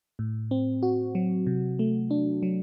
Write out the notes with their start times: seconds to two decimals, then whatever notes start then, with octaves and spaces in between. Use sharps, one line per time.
0.19 A2
0.51 C4
0.83 F#4
1.15 F#3
1.47 C3
1.79 A3
2.11 D4
2.43 F#3